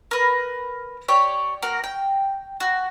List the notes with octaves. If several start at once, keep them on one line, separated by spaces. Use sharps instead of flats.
A#4 B4
G4 C#5 D5
A#3 F#4 A#4
G5
F#4